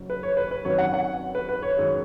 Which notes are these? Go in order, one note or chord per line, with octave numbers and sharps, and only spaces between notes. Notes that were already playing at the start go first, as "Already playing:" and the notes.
Already playing: F#1 F#2 F#3
B4
C#5
B4
B4
G#1 F#2 D#3 F#3 C#5
F#5
F#5
B4
B4
C#5
F#2 D#3 G#3 C#5